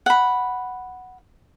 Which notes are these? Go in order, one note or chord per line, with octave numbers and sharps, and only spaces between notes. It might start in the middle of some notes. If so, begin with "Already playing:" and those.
F#5 B5